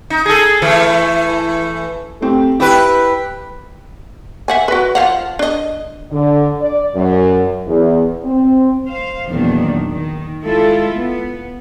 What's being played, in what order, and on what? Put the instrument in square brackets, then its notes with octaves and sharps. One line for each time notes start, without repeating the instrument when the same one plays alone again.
[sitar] D#4
G#4 A4
E3 A3
[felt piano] A3 C4 G4
[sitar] E4 B4 [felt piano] G4 G5 F#6
[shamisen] E5 F#5 G#5
F#4 B4
F3 F5 F#5
D4 D#5
[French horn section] D3
D5
F#2
E2
C4
[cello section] C5 F5
E2 A#2 D#3 F#3 D4
D#3
G#3 E4 F4 A4
B3